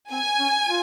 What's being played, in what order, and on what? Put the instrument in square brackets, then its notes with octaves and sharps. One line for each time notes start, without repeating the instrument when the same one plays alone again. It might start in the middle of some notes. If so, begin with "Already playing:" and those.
[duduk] C4 [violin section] G#5
[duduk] C#4
F4